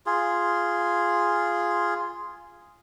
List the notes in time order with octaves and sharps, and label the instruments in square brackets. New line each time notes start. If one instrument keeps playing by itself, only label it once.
[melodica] F4 G#4